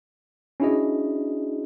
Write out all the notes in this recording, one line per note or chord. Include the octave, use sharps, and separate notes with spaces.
C#4 D4 E4 F#4 G#4 D#5